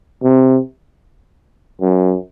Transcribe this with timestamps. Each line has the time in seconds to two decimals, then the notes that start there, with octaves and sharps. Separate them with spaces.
0.24 C3
1.81 F#2